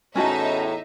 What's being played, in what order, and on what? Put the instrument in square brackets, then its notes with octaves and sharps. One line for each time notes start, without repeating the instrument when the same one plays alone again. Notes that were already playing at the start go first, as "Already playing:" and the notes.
[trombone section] E2 A2 [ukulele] C#4 F#4 A5 [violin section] D#4 E5